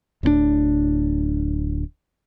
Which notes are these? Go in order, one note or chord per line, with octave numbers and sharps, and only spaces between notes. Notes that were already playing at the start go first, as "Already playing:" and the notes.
D1 A2 B3 D4